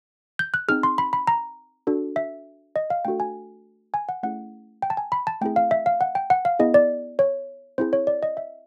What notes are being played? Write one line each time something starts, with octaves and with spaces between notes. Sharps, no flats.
G6
F#6
C4 D#4 G#4 F6
C6
B5
B5
A#5
D4 F#4 A4
E5
D#5
F5
A3 D4 F#4 A4 G5
G#5
G#5
F#5
A3 C#4 E4 G#4 F#5
G5
A5
G#5
B5
A5
A3 C4 E4 G#4 G5
F5
E5
F5
F#5
G5
F#5
F5
B3 E4 G#4 D#5
D5
C#5
C4 E4 G#4 C5
C#5
D5
D#5
E5